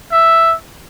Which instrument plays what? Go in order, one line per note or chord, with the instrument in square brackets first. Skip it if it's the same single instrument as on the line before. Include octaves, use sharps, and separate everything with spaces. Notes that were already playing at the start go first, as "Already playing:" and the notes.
[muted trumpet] E5